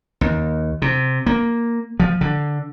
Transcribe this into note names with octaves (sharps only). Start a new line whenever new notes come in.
D#2
C3
A#3
F3
D3